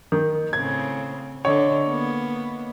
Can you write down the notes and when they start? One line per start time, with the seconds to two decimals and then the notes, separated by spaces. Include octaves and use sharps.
0.12 D#3
0.53 A2 C#3 C4 G#6
1.45 D3 C#5 D#5
1.85 A#3 B3